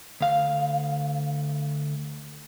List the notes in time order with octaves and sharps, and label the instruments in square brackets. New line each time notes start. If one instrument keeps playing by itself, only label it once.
[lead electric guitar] D2 F5